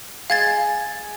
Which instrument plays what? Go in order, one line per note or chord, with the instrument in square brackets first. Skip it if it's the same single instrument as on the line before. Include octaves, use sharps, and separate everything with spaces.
[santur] G#3 [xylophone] F5 G#6 A6